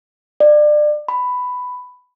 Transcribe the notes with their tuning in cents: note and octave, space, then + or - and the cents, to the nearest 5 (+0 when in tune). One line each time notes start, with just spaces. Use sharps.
D5 +30
B5 +10